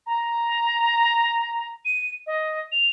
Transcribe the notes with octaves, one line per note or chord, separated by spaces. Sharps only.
A#5
D#7
D#5
F7